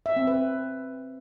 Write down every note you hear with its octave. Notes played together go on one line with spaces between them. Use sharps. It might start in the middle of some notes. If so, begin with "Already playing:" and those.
E5
C4
B4